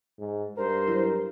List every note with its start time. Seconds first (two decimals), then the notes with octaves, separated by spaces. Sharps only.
0.19 G#2
0.57 G2 A#4 C5
0.88 F#3 E4